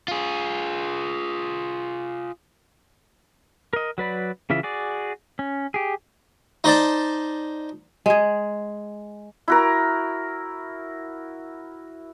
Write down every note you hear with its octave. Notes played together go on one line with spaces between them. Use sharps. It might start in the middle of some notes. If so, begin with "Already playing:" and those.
F4 G#4
A#4 D#5
F#3 B4 D5 B5
C#3 E3 F4 E5
F#4 G#4 D5
C#4
G4 G#4
D#4 C5 D5 A5
G#3 G#4
E4 F#4 A#4